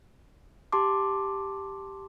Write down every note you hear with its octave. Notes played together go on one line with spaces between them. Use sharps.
G4 A5 C6 D6